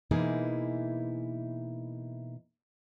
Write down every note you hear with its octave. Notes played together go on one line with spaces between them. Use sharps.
B2 E3 A#3 D#4 E4 G#4